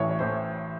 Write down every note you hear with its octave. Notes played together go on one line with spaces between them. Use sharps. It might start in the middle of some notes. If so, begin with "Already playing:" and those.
Already playing: A1 A2 E3 C#5
C#5
A2 E3 C5